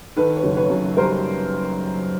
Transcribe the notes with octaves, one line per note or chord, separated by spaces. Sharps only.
D#3 A4 B4
B4 C#5
F#1
B4 C#5
F#2
G3 A#4 C5